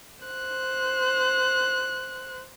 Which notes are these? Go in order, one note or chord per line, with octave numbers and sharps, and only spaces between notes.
C5 F#6